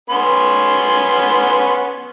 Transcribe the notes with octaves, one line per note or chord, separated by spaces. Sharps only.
B3 C#4 C6